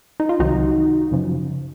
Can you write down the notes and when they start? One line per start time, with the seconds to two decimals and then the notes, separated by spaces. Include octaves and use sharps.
0.20 D#4
0.29 F4
0.39 C2 C3 D#3 F#3 D#4 F#4
1.11 F#2 C#3 F3